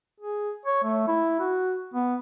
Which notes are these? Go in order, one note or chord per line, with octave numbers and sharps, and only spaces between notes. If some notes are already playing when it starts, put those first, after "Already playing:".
G#4
C#5
A3
E4
F#4
B3